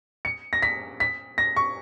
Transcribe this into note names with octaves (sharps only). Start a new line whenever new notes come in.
C#7
A#6
B6
B6
A#6
C#6